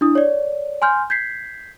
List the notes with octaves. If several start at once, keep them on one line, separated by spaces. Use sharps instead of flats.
D4 E4 D#6
C#5 D5
G#5 C6 F6 G6
G6 G#6 B6 C7